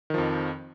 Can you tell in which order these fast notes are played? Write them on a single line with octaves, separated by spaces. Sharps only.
D#3 F3 F2